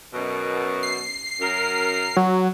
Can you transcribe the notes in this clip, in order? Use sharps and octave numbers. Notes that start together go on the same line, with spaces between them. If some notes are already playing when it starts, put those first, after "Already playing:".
F#2 B2
C7
F#2 A#4
F#3